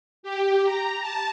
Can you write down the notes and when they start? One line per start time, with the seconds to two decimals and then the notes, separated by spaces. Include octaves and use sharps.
0.23 G4
0.64 A#5
1.01 A5